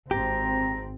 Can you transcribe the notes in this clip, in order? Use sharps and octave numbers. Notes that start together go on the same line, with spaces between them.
G#1 C4 G4 A#5